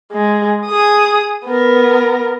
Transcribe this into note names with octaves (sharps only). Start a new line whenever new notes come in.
G#3
G#4 D#6
B3 A#4